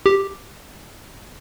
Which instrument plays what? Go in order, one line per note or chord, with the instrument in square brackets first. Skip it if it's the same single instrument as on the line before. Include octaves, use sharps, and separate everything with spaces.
[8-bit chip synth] G4